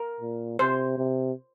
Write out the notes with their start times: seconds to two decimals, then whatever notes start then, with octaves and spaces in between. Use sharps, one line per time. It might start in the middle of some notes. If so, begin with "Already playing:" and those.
Already playing: A#4
0.20 A#2
0.59 C3 C5
0.98 C3